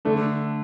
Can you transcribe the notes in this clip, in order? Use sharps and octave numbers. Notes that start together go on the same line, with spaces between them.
D3 A3 D4